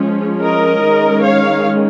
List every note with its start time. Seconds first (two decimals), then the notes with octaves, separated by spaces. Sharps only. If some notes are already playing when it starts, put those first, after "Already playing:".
Already playing: F3 G#3 C#4
0.42 A#4 D#5
0.83 D#3 G#3 C#4
1.23 C#5 F5